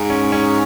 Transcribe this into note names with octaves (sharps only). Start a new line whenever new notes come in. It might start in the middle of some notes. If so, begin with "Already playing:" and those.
Already playing: G#2
C#4
C#4